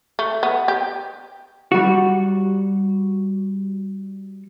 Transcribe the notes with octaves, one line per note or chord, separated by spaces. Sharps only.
A3
B3
G4
G3 F#4